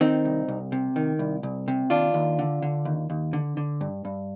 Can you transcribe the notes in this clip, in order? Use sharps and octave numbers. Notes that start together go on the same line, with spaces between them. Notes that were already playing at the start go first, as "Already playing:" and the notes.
D#3 C4 D#4
C2
C2
C3
D#3
C2
C2
C3
D#2 D4 F4
D#2
D3
D3
D#2
D#2
D3
D3
G2
G2